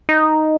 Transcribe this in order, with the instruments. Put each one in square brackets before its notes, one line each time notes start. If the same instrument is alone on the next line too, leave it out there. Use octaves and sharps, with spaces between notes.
[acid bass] D#4